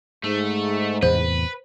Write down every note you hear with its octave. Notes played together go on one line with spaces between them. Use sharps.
G#2 A3
E2 A2 C3 B4 C5